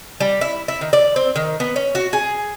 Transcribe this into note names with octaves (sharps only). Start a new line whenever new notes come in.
G3
E4
E4
D#3
D5
C4
D#3
B3
C#4
F#4
G#4